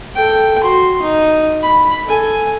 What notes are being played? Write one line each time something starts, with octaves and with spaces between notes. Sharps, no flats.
A4 G5
F#4 C6
D#4
B5
A4 G#5